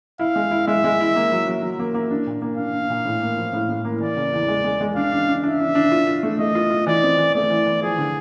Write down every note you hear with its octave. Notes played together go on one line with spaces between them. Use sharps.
E4 F5
G#3
E4
G#3 E5
G#3
E4
A#3
F#3
F#3
F#3
A#3
A#3
D4
A#2
A#3
D4 F5
D4
A#2
A2
A#3
F3
A2
A2
A#3
E3 D5
C#3
E2
G#3
G#3
G#3
D4 F5
D4
D4
D4 E5
D4
D4
F4
F4
A3
A3 D#5
F4
F4
E3 D5
C4
E3
A3 D5
E3
E3
F3 G#4
D3